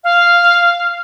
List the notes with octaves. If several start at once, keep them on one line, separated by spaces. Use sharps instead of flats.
F5